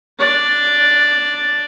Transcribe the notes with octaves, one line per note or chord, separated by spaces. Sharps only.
D4 D5